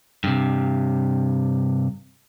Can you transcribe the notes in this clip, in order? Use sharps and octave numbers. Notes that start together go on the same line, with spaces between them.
G2 C3